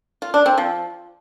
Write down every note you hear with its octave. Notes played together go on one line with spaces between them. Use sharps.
F4
D4
C4
F3